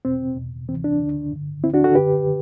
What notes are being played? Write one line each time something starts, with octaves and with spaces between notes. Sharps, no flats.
E2 B2 C4
E2 B2
D2 C3 E3 C4
D4
D2 D3
G2 D3
D2 D3 C4 E4
D4 F#4
F#4 A4
F#2 D3 G4 B4